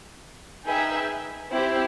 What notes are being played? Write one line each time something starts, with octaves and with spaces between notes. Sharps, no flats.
D#4 G#4 B4 E5 G5
C4 E4 G4 C5